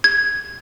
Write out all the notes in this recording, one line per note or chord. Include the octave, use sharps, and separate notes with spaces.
G#6